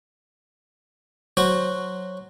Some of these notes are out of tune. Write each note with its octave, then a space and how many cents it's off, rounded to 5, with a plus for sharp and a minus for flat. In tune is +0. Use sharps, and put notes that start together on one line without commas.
F#3 +0 F#4 +0 C5 +0